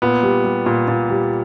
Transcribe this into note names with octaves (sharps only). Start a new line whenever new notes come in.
A#2 B3
G3
G3
A#2
A#2
G3